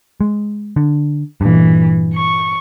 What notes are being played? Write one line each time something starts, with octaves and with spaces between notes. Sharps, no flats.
G#3
D3
G2 A#2 E3
C#6